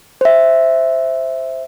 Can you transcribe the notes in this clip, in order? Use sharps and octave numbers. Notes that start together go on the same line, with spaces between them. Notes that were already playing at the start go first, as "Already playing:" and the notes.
C5 E5